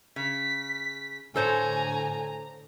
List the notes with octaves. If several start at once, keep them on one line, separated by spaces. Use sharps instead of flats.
C#3 B6
A2 D3 A4 C5 C#5 G#5 A#5